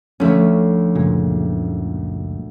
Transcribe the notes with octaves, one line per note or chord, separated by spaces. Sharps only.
D2 F3 A3 C#4 E5
F#1 C#2 A#2